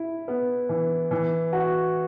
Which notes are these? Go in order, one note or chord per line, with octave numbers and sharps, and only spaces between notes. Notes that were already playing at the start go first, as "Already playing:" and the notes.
Already playing: E4
B3
E3
E3
F#4